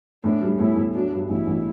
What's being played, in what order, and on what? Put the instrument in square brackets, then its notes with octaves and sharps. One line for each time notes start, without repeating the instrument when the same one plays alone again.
[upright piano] A2 [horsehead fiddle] D4
[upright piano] G3
[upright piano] A2 [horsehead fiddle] E4
[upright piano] A2
[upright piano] F#3 [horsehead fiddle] D4
[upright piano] G2
[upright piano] A1 [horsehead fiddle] E4
[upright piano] A1